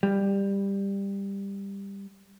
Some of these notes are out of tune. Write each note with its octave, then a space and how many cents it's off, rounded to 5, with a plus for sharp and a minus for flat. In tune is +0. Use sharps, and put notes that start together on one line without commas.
G3 +15